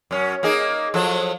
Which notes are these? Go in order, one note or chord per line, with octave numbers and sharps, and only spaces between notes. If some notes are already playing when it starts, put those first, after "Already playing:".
F#2 C#4
A#3 D#4 G#4
F3 F#3 A4